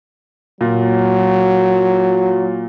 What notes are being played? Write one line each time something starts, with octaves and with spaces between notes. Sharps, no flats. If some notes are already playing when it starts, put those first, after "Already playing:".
A#2 F#3